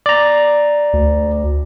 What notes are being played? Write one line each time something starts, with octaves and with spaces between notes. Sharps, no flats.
D5 A#5
D2